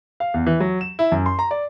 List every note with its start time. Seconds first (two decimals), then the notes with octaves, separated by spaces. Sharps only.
0.20 F5
0.34 E2
0.47 E3
0.60 F#3
0.81 E7
0.99 E4
1.12 F#2
1.26 C6
1.39 A#5
1.51 D5